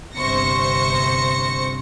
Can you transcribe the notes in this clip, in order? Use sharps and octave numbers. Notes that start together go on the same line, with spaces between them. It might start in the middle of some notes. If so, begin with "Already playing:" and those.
G1 C3 C5 C#6 A#6 C#7